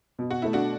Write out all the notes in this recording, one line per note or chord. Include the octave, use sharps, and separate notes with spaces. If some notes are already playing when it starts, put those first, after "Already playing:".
B2
F#4
A3 E4
D4 F#4